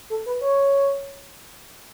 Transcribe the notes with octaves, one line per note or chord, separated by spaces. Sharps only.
A4
B4
C#5